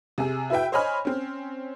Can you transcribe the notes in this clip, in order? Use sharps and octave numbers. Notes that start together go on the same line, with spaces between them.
C3 G#4
E4 F#4 B4 E5 G5
C5 C#5 D#5 G#5 B5 F6
C4 C#4